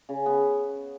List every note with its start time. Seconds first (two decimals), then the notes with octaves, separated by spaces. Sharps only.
0.09 C#3
0.26 B3